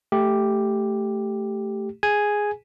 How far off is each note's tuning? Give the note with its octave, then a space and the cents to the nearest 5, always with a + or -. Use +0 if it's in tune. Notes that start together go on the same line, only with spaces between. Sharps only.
A3 +0 G4 +0
G#4 +0 G#5 +0